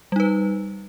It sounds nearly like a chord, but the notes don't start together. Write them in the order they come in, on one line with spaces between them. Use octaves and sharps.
G3 D#4 B4